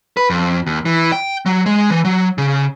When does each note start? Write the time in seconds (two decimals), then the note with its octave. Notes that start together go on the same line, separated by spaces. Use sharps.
0.17 B4
0.30 F2
0.67 D#2
0.85 E3
1.12 G5
1.46 F#3
1.66 G#3
1.90 E3
2.05 F#3
2.38 C#3